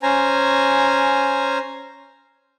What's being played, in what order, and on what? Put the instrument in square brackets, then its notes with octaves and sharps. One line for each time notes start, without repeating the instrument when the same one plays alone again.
[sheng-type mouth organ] C#4 C5 G#5 A#5